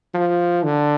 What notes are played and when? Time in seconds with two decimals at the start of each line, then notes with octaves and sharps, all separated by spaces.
0.15 F3
0.64 D3